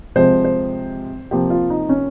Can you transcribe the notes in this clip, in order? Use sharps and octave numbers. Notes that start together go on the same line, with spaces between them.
C3 F3 G#3 C5
C5
C3 F3 A#3 G4
F4
D#4
C#4